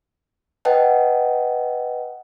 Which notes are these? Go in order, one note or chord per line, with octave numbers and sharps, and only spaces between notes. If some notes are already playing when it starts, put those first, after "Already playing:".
B4 D#5 F#5 G5 A5